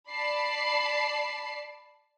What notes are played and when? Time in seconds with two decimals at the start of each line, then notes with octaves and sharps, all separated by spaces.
0.10 D5 A5 B5 C7